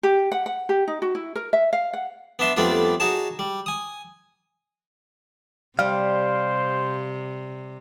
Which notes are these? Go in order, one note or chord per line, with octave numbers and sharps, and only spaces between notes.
G4
F#5
F#5
G4
D#4
F#4
E4
A#4
E5
F5
F#5
B3 D4 E5 C6
F2 G3 A3 B3 D4 F4
D#4 F#4 G#4 C#5 A5
G3
G#5 D#6
C3 G3 C5 F5